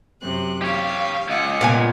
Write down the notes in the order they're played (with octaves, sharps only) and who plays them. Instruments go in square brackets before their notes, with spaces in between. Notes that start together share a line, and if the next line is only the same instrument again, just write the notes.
[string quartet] F#2 C3 F#6
[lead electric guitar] G4 C#5 [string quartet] F5
[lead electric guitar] C#2 [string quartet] D#5 F5 F#5
[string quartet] G2 [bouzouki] A#2 B3 G#5